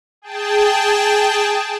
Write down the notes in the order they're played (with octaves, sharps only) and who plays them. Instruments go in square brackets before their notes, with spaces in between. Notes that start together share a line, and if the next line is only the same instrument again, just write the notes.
[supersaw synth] G#4 G5 A5